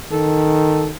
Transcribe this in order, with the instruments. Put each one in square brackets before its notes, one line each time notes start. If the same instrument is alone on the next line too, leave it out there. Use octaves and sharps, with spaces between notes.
[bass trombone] D#3 [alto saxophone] A4